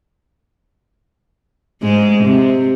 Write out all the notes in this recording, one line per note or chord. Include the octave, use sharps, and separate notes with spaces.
G#2 G#3
C3